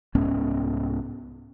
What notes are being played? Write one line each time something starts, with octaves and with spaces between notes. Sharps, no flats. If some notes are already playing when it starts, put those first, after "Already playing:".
C2 G#2 B3 C#4